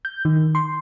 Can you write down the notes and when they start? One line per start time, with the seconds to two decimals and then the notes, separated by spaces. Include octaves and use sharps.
0.05 G6
0.25 D#3
0.55 C6